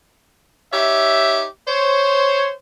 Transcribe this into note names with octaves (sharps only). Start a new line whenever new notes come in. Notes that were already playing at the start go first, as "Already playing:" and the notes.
D#4 G4 C#5 E5
C5 C#5